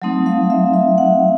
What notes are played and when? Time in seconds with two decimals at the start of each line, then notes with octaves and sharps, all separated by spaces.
0.02 F#3 A3 C4 D#4
0.26 F5
0.50 E5
0.74 E5
0.98 F#5